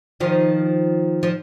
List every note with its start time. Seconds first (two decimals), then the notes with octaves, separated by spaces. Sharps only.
0.20 D#3 F3
1.23 F3